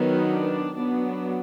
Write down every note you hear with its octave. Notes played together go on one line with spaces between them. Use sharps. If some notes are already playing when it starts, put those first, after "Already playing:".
Already playing: D#3 F#3 B3
D4
F#3 B3 D4